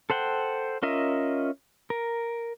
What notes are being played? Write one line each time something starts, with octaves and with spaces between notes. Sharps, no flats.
A4 C5 F#5 G5
C#4 F4 A#4 D#5 E5
A#4